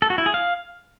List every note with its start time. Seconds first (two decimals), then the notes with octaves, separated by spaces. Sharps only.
0.02 A4
0.10 F#4
0.18 E4
0.26 G#4
0.34 F5